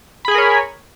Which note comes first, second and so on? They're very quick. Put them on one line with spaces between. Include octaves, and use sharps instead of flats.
B5 G#4 G#5 A#4 C#5